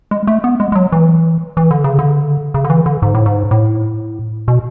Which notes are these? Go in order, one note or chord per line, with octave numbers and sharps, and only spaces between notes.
G#3
A3
B3
G#3
G#3
F#3
E3
E3
D3
C#3
D3
C#3
D3
E3
D3
G#2
A2
G#2
A2
B2